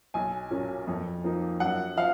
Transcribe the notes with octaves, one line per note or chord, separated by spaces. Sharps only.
B1 G#5
A#2 F#3 A#3 C#4
F2
F3 A#3 D#4
F#2 F#5
F3 F5